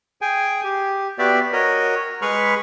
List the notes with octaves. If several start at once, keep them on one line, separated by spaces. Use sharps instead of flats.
G#4 G5 G#5
G4
B3 F#4 G4 D5 E5
F#4 A#4 C#5 D#5
G#3 G#4 B4 B5 C#6 F6